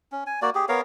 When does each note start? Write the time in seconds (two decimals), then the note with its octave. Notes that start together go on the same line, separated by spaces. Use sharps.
0.12 C#4
0.26 G#5
0.42 A#3 F#4 D5
0.55 G4 G#4
0.69 B3 A#4 C#5 F5